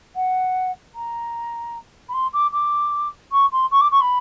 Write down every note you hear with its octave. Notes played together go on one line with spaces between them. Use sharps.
F#5
A#5
B5
C6
D6
D6
C#6
C6
C#6
D6
C#6
B5